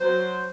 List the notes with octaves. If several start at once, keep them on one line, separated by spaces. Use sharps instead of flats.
F#3 C5